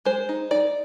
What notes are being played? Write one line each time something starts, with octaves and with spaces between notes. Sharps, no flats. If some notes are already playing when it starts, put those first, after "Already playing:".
G#3 C5
D#4
D#4 D5